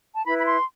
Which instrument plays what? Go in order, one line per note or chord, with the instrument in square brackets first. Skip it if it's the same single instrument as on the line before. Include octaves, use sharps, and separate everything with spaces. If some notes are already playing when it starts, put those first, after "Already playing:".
[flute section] A5
E4 B4 B5
B5
C6